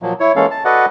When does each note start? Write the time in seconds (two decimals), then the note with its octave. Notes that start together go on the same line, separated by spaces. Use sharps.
0.02 A#2 F3 F#3 A#3
0.20 E4 C#5
0.36 E3 G#3 A#3 C#4 A4 F5
0.51 A5
0.65 F#4 A4 B4 D5 D#5 F#5